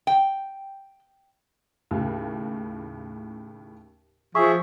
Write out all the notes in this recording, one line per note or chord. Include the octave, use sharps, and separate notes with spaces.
G5
D#2 A2 C#3
F3 G#4 E5 C#6